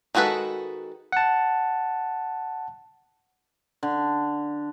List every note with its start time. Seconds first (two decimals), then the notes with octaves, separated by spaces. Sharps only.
0.15 D#3 G#3 F#4 A4 B4
1.12 F#5 A5
3.83 D3